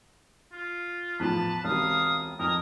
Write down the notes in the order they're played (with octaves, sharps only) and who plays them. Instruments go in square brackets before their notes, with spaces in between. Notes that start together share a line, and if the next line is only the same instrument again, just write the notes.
[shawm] F4
[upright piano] E2 A2 F3 [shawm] B4 [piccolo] A5
[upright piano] E1 C#2 C3 [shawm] F5 [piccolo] D#6
[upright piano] F2 [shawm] A#4 [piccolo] D#6